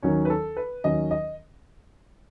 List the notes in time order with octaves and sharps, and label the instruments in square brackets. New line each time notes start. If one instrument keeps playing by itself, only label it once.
[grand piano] D#2 D#3 F#3 C#4 [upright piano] C#5
[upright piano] B4
A4
B4
[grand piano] D#2 D#3 F#3 C#4 [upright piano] D#5
[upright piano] D#5